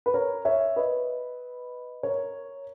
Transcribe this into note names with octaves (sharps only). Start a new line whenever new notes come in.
B4
A#4 C#5
C#5 E5
B4 D#5
A#4 C#5